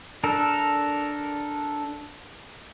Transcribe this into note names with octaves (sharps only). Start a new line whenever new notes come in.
D4 A4 A#4